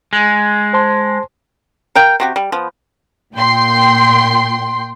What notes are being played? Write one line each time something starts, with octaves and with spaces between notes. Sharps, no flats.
G#3
C5 A5 C6
A#4 F5 G5
C3 F#4 G4
G3
F3 B3
A#2 G5 C6